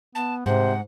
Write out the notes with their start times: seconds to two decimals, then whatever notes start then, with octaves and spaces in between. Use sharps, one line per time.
0.15 B3 A5
0.46 G#2 C3 C5 F#5